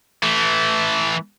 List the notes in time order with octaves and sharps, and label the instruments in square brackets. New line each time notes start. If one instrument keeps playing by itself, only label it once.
[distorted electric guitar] E3 A3